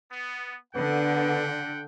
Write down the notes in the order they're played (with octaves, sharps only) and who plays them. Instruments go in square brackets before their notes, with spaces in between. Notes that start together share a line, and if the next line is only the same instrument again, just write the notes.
[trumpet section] B3
[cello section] D3 [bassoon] B3 [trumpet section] F#5 G5